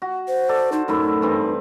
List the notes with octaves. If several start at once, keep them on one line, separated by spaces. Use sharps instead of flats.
F#4
C5
A4 D5
D#4 C5
F#2 A2 D#4 E4
G2 E3 C4